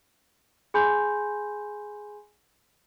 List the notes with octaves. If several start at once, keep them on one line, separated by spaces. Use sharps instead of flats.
G#4 G#5 B5 C6 G6